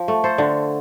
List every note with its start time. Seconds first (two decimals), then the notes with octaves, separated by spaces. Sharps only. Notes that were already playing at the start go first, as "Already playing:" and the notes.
Already playing: F3
0.08 A3
0.24 A4 C5
0.38 D3